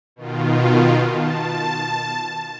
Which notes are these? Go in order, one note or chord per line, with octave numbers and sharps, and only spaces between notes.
B2 D#3 F4
A5